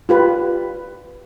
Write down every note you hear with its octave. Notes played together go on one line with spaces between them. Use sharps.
F4 G4 B4